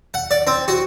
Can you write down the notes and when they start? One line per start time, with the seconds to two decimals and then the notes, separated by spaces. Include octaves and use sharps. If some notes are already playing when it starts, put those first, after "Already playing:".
0.14 F#5
0.31 D5
0.47 C4
0.68 F#4